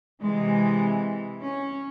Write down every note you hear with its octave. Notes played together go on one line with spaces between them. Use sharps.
C3 E3 G#3
C#4